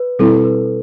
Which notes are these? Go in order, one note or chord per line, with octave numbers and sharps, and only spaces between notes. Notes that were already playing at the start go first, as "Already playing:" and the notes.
Already playing: B4
B2 G3 C4 E4 A4
B4